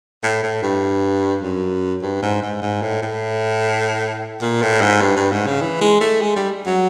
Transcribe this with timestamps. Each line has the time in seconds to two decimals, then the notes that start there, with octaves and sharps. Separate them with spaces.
0.23 A2
0.43 A2
0.63 G2
1.42 F#2
2.02 G2
2.22 G#2
2.42 G#2
2.62 G#2
2.82 A2
3.02 A2
4.42 A#2
4.62 A2
4.81 G#2
5.01 G2
5.16 G2
5.32 G#2
5.46 C#3
5.61 E3
5.81 G#3
6.01 A3
6.22 G#3
6.36 G3
6.66 F#3